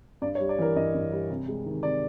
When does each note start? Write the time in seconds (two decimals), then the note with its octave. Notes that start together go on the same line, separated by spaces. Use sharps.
0.22 G2 D5
0.35 C#5
0.40 G3
0.49 D5
0.59 E3 A#4
0.76 G2 D#5
0.94 G2
1.12 G3
1.30 C3
1.48 G#3
1.66 D#3
1.83 C3 D5